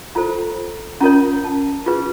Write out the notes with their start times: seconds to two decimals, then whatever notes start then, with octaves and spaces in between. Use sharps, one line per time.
0.15 F4 A4 C5 A#5
1.00 C#4 F4 A#4 C#5 A#5
1.44 A5
1.86 F4 G#4 B4